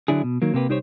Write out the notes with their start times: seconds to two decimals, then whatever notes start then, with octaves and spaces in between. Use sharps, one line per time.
0.08 D3 F#3 D4 E4 G#4
0.24 B2
0.42 D#3 F#3 A#3
0.54 C3 A#3 G4 B4
0.69 C2 D#4 G4 C5 C#5